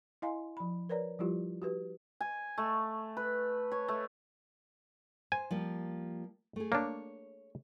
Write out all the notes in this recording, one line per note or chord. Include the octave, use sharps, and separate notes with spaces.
E4 D#5 F5 G#5 A#5 C6
F3 B5
A#4 B4 C#5 D5 A#5
F3 G3 E4 F4 G4
F#4 G4 B4
G#5
A3
B4
C#5
A3
C5 G#5
F3 G3 A#3
A3 G#4
A#3 D4 C#5